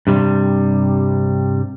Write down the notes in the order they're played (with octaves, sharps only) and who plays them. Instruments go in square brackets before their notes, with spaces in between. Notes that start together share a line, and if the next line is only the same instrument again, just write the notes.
[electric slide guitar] G2 C3 G3